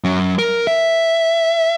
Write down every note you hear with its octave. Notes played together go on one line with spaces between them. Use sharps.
F#3 C#4
A#4
E5